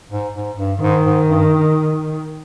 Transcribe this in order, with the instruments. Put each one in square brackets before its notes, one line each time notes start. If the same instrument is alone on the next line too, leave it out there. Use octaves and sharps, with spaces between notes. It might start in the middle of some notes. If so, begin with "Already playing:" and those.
[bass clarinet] G#2
G#2
G2
[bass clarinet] G#2 [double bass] D#3
[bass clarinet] G#2
G2